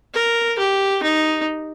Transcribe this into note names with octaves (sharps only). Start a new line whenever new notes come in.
A#4
G4
D#4